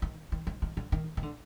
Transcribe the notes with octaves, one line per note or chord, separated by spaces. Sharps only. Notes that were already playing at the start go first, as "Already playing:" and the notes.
D#3
D#3
D#3
D#3
D3
D#3
D#3
D3